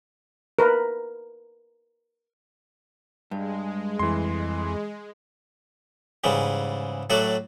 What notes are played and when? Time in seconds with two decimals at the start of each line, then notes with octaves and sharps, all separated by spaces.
0.59 A#4 B4
3.31 G2 G#3
3.99 F2 E3 C6
6.24 G#2 C#3 E3 G3
7.10 A2 F#3 A3 F#4 D5